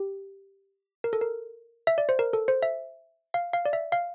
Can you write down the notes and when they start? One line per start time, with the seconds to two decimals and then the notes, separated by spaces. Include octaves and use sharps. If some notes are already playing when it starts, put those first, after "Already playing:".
Already playing: G4
1.04 A#4
1.13 A4
1.21 A#4
1.87 E5
1.98 D5
2.09 C5
2.19 A#4
2.33 A4
2.48 C5
2.63 E5
3.34 F5
3.53 F5
3.65 D5
3.73 E5
3.92 F5